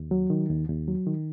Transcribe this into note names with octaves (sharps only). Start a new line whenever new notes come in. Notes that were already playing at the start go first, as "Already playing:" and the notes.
Already playing: D#2
F#3
D#3
D#2
D#2
F#3
D#3